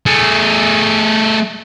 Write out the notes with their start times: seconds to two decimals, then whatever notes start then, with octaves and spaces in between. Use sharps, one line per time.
0.06 A3 G#4